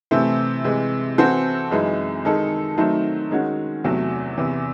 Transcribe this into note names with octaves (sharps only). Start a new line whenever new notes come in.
C3 E3 A3 C4
C3 E3 G#3
E3 C4 F#4 A4
F#2 E3 G#3 D#4
D#3 G#3 D#4 A4
D#3 F#3 A3 C4 D#4
D#3 G#3 C#4 F#4
E2 C3 F#3 A3
E2 C3 E3